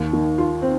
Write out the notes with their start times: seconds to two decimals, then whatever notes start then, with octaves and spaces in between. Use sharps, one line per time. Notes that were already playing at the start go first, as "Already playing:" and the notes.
Already playing: D#2
0.13 D#3
0.38 F4
0.62 C4